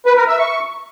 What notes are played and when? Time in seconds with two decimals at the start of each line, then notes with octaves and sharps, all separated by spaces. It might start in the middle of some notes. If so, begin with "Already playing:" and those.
0.06 B4
0.17 A#4
0.28 E5
0.39 C#6